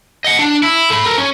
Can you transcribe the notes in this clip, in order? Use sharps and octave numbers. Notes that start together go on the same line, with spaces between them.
D#5 F#5
D4
E4
A4 B5
A4 A#4
C#4